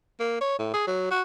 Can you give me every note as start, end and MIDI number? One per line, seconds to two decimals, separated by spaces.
0.20 0.37 58
0.41 0.56 73
0.59 0.73 45
0.74 0.83 68
0.87 1.09 54
1.11 1.22 66